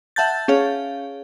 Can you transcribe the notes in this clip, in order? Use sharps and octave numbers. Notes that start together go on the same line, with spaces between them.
E5 F#5 A5 G6 A6
C#4 G#4 C#5 F5